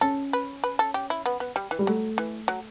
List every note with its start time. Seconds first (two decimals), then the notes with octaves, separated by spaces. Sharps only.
0.01 C#4 A4
0.33 B4
0.64 B4
0.79 A4
0.94 G4
1.10 E4
1.26 B3
1.40 B3
1.56 G3
1.71 E3
1.79 G3
1.87 F#3 A3
2.18 E3
2.48 F#3